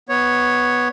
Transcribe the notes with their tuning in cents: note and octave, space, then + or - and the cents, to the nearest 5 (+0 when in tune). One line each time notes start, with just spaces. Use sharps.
B3 +0 C#5 +0